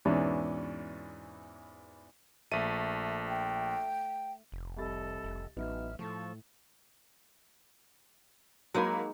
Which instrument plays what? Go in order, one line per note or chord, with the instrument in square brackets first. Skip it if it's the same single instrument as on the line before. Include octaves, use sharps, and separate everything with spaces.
[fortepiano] E2 G#2 B2 E3 C#4 D4
[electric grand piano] A#1 D#7 [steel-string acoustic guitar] A3
[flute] G5
[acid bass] F1
[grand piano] C2 B5 A6 [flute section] A4 D#5
[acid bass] F1
[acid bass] A1 [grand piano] F#3 B3 D#4 [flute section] E5 F6
[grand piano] A2 [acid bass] F3 [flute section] A4 A5 C#6
[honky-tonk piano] F#3 A#3 B5 [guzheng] G#3 D#4 G#5